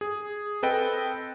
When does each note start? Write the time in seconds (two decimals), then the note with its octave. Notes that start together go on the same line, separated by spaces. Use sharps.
0.01 G#4
0.63 C4 A4 B4 D#5 G5